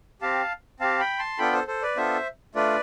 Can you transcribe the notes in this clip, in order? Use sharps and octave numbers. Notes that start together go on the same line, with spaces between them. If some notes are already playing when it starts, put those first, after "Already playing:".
C4 G4 F5 A5
C4 G4 F5 A5
G5 B5
A5 C6
B3 D4 F4 A4 G5 B5
A4 C5
A4 C5
B4 D5
B3 D4 F4 A4 C5 E5
A3 D4 F4 B4 D5